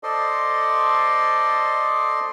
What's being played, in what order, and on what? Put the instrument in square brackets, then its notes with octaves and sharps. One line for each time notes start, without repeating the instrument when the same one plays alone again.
[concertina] A4 C5 D5 D#5 C6